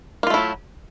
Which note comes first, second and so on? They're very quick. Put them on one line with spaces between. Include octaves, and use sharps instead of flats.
A#3 F4 A3 E4 F#3